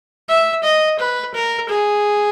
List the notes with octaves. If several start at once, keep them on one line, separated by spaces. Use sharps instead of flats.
E5
D#5
B4
A#4
G#4